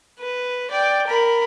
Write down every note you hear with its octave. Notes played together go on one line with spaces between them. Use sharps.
B4
D5 G5
A#4 B5